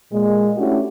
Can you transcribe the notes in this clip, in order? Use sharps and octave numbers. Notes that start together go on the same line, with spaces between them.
A#2 G#3
A3 C#4 D4 E4 F#4 G4